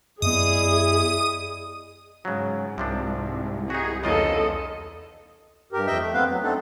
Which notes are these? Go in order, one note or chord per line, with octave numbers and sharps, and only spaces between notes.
F#2 B3 E4 G#4 D5 D#5 D#6
G#2 C#3 F#3
C2 C3 F3 D4
D#4 F#4 G#4
E2 C#3 F4 A4 A#4 D#5
G2 G4 A#4
F2 D#5 E5 G5
A3
E2 B3 C4 B4 F5
F#3 B3
A3 C4 D4 D#4 A4